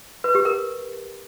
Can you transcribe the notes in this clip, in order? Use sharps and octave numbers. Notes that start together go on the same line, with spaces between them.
B4
G4
A#4